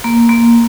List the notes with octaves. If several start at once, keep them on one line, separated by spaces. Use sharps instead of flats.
A#3
A#3